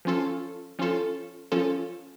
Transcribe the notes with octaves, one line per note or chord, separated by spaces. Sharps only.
F3 C#4 F4 A4
F3 C#4 F4 A4
F3 C#4 F4 A4